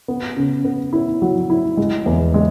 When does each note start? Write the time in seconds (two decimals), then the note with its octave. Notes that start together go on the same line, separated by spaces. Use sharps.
0.08 B3
0.37 C#3
0.65 B3
0.93 E4
1.22 F#3
1.50 E4
1.77 G#3
2.06 E2
2.34 G#3